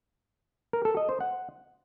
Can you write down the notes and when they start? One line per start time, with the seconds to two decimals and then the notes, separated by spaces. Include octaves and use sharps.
0.73 A#4
0.85 A4
0.97 D#5
1.09 C5
1.21 F#5